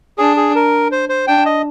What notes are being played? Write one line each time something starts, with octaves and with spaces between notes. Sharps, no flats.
D4 G#4
G#4
A#4
C5
C5
D4 G5
D#5